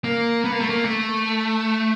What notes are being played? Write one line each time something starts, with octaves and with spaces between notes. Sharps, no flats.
A#3
B3
A#3
A3
A#3
A3